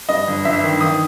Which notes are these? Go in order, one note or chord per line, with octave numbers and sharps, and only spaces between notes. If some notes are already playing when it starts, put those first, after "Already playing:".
G2 D#5
G1
G1 E5
D#3
D#3 D#6